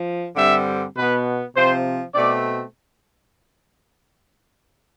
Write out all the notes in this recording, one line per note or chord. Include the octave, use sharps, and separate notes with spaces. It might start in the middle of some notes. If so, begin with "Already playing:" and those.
Already playing: F3
G2 D3 G3 C4 E5
B2 B3 B4
C3 F3 C4 C5
B2 A3 C4 D5